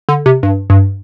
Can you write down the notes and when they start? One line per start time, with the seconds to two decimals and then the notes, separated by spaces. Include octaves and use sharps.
0.09 D3
0.26 C3
0.43 G2
0.70 G2